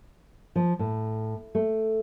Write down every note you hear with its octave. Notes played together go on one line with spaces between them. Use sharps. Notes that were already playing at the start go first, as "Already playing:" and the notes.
F3
A2
A3